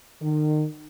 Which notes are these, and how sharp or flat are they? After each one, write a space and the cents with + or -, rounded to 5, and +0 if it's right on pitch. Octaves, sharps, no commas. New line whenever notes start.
D#3 -35